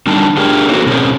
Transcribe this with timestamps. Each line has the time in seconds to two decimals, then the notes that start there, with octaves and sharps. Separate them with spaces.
0.07 D3 G3 A#3 D#4 A5
0.37 A3 D4 G4 G#4 A#4
0.68 A3 A#3 C4 D#4 F#4 A4
0.86 B2 C4 C#4 F#4 G#4 A#4